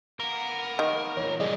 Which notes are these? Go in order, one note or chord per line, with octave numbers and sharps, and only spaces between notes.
A#3 B3 A#4
D#3
E2 A#2 C#5
E3 G3 G#4 D5 D#5